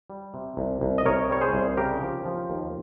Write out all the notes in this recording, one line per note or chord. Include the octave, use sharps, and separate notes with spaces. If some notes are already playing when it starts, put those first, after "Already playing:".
G3
C3
C2
C2
D#5
C2 A#4 C#5
G3 C#5
G#4 C5
C2
C#3 G4 A#4
F3
F3
D#2